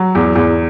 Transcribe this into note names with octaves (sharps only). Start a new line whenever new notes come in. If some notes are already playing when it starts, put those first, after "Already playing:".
Already playing: F#3
E2
E2